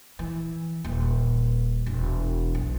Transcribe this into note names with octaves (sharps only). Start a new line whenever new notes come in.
E3
D#1
E1
B1